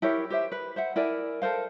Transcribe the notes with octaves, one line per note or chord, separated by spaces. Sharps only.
E4 G4 A#4 C#5
G4 C5 E5
B4
C5 E5 F#5
E4 A#4 D5 G#5
A4 A#4 C5 F5